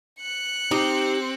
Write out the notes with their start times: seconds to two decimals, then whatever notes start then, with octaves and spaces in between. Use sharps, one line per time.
0.21 F#6 C#7
0.71 C4 D#4 G4